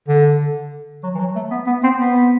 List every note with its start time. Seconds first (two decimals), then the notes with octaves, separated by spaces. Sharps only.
0.08 D3
1.03 F#3
1.15 E3
1.19 F#3
1.36 A3
1.51 B3
1.67 B3
1.83 C4
1.99 B3